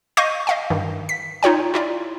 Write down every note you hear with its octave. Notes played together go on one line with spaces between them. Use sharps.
D#5 F5 C#6 G6 A#6 D#7
D#5 F5 G5
G2 D#3
B6
D#4 F4 C#5 G5
E4 F4 D5